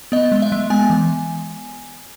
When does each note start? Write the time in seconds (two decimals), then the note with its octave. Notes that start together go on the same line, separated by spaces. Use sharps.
0.12 B3 D#5
0.32 G#3
0.42 E5
0.52 G#3
0.70 B3 G#5
0.90 E3